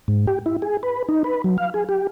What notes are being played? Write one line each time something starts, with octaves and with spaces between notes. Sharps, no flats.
G#2
G4
E4
G#4
B4
D#4
B4
F#3
F5
G#4
G4